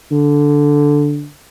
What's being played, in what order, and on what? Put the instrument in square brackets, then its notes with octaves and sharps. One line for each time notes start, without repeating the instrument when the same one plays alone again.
[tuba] D3